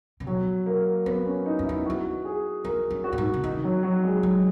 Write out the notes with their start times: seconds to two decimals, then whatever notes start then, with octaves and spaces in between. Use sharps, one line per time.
0.20 C#3
0.27 B2 F#3
0.66 A#3
1.06 F#2 B3
1.26 C#4
1.46 D#4
1.59 F#2
1.65 E4
1.69 E2
1.85 E2 F#4
2.25 G#4
2.64 E2 A#4
2.91 F#2
3.04 F#4
3.13 A#2
3.18 G#2
3.34 C#3
3.44 D#3 D#4
3.64 F#3
3.83 F#3
4.03 G#3
4.23 F#3